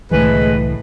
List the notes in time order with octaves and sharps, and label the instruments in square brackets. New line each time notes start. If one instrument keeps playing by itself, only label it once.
[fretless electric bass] C2 D3 E3 [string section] A2 [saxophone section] G#3 B4